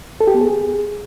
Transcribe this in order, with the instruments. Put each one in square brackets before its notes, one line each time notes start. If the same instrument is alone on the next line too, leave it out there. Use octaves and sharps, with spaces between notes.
[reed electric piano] A4
G4
B3
G#4